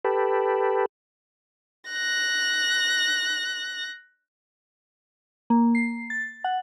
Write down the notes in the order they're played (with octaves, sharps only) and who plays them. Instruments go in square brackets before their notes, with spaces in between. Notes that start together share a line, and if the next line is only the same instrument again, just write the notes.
[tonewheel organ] G4 A4 B4
[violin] F#6 A#6
[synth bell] A#3
C7
A6
F#5